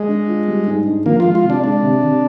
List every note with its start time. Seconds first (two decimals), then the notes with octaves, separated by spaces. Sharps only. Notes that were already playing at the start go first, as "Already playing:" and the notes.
Already playing: G#3
0.08 D4
0.28 F4
0.48 G3
0.67 G#2
0.86 D4
1.06 F3 A#3
1.20 G#3 F4
1.35 F4
1.44 C3
1.50 D4
1.63 G#3 D4
1.83 C3
2.03 C3